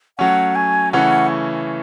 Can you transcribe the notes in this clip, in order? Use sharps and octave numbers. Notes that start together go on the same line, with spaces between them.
F#3 A3 C#4 F#5
G#5
C#3 E3 A3 C#4 F#5